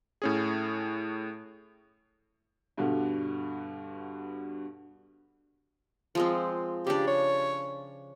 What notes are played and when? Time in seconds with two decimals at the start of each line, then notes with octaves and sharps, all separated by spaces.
0.22 A2 C#4 G#4
2.78 G2 B2 D3
6.15 F3 G#3 C4
6.87 C#3 D4 G4
7.07 C#5